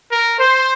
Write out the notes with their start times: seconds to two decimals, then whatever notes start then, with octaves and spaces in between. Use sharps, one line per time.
0.11 A#4
0.39 C5